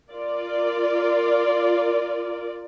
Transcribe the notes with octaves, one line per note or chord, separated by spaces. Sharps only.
F4 A#4 D5